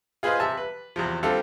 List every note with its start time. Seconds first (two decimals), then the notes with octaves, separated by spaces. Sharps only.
0.23 F4 G#4 B4 C5 D#5 F5
0.40 C3 E5 A5
0.57 B4
0.96 E2 C3 F3
1.23 D3 G3 C4 F4 A4